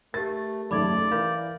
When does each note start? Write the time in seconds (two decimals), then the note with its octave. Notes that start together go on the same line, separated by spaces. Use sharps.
0.14 A3 G4 A#4 A6
0.71 F#1 D#2 A3 D5 B5 D6 G#6
1.11 E3 A#4 F5 B5 G6